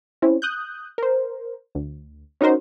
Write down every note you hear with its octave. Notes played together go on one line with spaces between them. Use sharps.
C4 C#4 E4
D#6 F#6 G6
A#4 C5
D2
C#4 D#4 F#4 A#4 C5